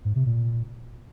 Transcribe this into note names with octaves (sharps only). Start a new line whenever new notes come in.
G#2
C3
A#2